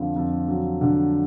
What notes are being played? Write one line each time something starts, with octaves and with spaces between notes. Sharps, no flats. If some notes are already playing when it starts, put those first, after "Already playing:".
Already playing: F2 D3 F4
F2
F#3
D3